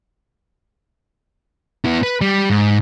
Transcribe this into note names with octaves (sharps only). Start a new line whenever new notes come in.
B3 E4
B4
G3
G#2